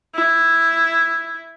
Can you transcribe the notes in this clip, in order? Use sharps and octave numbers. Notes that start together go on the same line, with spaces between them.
E4